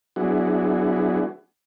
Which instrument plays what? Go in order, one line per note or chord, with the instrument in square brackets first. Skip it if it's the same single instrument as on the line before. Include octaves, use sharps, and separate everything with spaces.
[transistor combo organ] F#3 B3 D4 E4 F#4 G#4